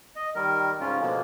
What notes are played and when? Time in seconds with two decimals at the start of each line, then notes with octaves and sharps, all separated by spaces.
0.16 D#5
0.35 D#3 G3 A#4
0.80 G#2 C#3 C#4 F4
1.01 B2 D3 F3 G#3 A#3